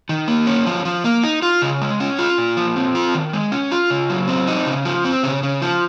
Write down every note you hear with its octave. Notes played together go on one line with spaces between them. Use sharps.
D#3
A#3
C#4
F3
F3
A#3
D#4
F4
C#3
G#3
C#4
F4
A#2
F3
C4
F4
D#3
G#3
C#4
F4
C#3
F#3
C4
D#4
C#3
F3
C4
C#3
C#3
F3